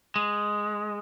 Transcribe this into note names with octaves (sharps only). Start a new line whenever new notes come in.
G#3